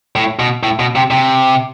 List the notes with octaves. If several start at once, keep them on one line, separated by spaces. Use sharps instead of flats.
A2
B2
A2
B2
C3
C3